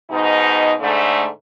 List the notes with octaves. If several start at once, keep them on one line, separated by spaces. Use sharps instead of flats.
G#2 B2 D#4
G#2 D3 A3